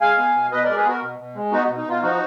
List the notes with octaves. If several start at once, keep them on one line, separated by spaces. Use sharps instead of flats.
G#3 F5 G#5
B3
B2
B2 B4 D#5
G#3 A#4 D5
G#4 B4
B3 F#4 A#4
B2
B2
G#3
B3 D#4 F#4
B2
D#4
B2 F4
F3 D#4 F#4